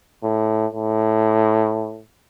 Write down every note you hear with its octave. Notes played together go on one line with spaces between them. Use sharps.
A2
A2